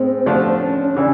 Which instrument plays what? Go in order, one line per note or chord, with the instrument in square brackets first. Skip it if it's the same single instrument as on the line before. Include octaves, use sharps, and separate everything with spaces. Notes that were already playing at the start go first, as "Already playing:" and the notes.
Already playing: [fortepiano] A2 G#3 [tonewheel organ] C4
[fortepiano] D3 F3 A3 D4 F4
[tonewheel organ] C4
C#4
C#4
[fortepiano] C#3 E3 [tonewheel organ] D4